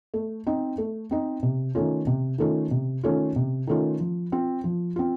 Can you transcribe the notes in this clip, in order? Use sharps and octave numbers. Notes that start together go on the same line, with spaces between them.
A3
C4 D#4
A3
C4 D#4
C3
D#3 A3 C#4 F4
C3
D#3 A3 C#4 F4
C3
D#3 A3 C#4 F4
C3
D#3 A3 C#4 F4
F3
C4 F4
F3
C4 F4